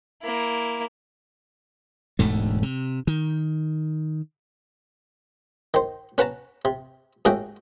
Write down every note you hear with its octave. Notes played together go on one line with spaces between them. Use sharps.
A#3 E4
E1 D2 G#2 A3
C3
D#3
D#3 C5
C#4 B4 F#5 A5 A#5
C3
D#2 G#2 C#4 F#4 E5 G5